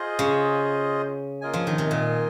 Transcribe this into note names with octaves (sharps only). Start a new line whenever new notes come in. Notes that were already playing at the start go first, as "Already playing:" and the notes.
Already playing: F4 G#4 C5 D#5
C#3
A#3 F4 A#4 D#5 G#5
F3
D#3
C3
A#2